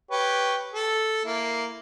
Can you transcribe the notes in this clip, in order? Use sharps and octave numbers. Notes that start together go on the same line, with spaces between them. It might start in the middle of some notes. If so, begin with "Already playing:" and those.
G4 B4 C#5
A4
A#3 E4